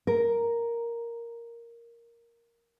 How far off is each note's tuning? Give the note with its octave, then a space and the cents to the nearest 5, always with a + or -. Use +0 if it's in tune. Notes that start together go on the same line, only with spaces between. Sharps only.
A#4 +0